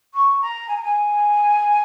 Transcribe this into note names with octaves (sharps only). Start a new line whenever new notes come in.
C#6
A#5
G#5
A#5
G#5